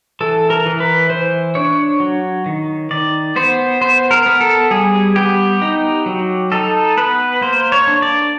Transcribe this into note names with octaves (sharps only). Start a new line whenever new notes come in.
E3 A4
A#4
E3
B4
E3 C5
D4 C#5
F#3
D#3
D#3 D5
B3 C5
B3 C5
A#4
B3
A4
G3 G#4
B3 G4
D#4
F#3
D#4 A4
B3 B4
A#3 C5
C#5
D4
D5